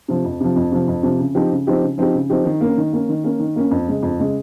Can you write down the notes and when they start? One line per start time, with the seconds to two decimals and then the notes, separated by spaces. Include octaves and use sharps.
0.08 C3 F3
0.25 F2
0.40 C3 F3
0.56 F2
0.72 C3 F3
0.88 F2
1.03 C3 F3
1.20 C#3
1.35 F3 C4 D#4 G4
1.51 C#3
1.67 F3 C4 D#4 G4
1.83 C#3
1.98 F3 C4 D#4 G4
2.14 C#3
2.30 F3 C4 D#4 G4
2.45 D#3
2.61 A#3 C#4
2.77 D#3
2.93 A#3 C#4
3.09 D#3
3.24 A#3 C#4
3.40 D#3
3.56 A#3 C#4
3.71 F2
3.87 C#3 G#3
4.03 F2
4.19 C#3 G#3